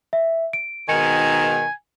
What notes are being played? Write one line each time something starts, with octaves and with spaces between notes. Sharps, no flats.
E5
D7
G#2 B2 D#3 G#5 C#7